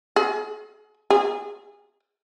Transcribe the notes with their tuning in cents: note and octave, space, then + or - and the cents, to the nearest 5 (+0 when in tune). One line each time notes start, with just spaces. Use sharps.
G#4 +40
G#4 -25